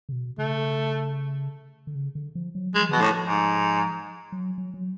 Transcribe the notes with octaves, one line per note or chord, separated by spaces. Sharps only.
C#3
B2
C#3 A3
D3
C#3
D3
F3
F#3
F#3 G#3
F3
D3
B2
A2 F3
G#2
F#3
F#3
F#3